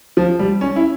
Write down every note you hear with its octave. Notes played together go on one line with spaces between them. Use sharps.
F3
G3
C#4
E4